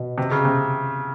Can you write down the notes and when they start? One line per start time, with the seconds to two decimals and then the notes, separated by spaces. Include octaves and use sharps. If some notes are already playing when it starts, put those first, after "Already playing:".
Already playing: B2
0.18 C3
0.31 C#3
0.45 C3